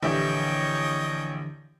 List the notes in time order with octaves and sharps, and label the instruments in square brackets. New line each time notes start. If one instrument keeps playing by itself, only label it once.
[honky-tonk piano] A#1 E4 G4 [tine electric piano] D3 E3 [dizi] C#5 [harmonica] D#5 G5